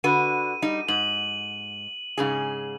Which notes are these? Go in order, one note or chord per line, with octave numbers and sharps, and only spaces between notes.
D3 F#4 B4 D#7
G3 D#4
G#2 F#7
G#2 C#3 G#4